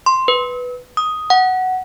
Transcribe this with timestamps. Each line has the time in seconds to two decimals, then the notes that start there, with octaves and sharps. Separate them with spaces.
0.06 C6
0.28 B4
0.97 D#6
1.30 F#5